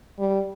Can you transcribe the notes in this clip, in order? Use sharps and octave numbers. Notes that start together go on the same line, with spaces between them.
G3